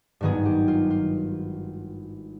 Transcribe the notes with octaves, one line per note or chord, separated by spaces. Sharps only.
G#1 G2 D#3 F#3 B3 G#4
G4
F4
F4